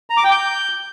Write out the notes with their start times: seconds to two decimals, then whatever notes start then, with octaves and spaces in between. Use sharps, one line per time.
0.10 A#5
0.17 D6
0.24 G5
0.31 G6